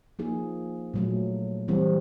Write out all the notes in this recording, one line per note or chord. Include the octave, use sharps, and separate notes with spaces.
F3 A#3 D#4 G#4
A#2 F#3 A3
E3 G3 C4